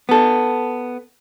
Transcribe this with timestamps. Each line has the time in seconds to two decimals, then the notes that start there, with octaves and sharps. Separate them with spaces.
0.09 B3 A4